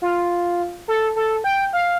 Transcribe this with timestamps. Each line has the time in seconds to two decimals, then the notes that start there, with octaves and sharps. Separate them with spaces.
0.02 F4
0.88 A4
1.16 A4
1.44 G5
1.73 F5